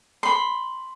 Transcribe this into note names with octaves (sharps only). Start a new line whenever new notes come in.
B5 C6